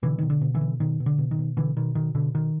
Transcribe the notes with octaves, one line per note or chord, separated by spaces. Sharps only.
B2 D3 E3
B2 D#3
D3
B2
D3 E3
B2
B2 D#3
B2
D3
B2
D#3
B2
B2 D3 E3
B2 D#3
B2 D#3
B2 D3
B2 D#3